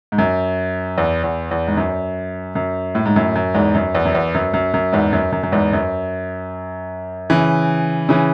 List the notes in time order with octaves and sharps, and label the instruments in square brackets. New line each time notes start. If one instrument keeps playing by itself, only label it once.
[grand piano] G#2
F#2
E2
E2
E2
G#2
F#2
F#2
A2
G#2
F#2 A2
F#2
E2 G#2
F#2
E2
F#2
E2
F#2
F#2
F#2
E2 G#2
F#2
F#2
F#2
E2 G#2
F#2
C#3 E3
C#3 E3